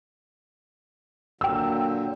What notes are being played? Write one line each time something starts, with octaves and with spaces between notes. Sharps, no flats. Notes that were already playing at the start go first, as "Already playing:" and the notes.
A#2 D3 F#3 G5 E6